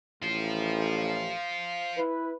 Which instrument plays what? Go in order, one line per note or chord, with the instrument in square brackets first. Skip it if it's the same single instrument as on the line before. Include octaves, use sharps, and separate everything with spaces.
[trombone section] A1 [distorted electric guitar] F4 C5
[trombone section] E4 B4